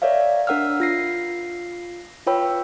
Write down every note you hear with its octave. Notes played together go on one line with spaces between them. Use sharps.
A#4 C#5 D5 E5 F5
D4 A#4 F#5 E6 F6
F4 A#6 C7
F4 B4 C#5 G5 B5 E6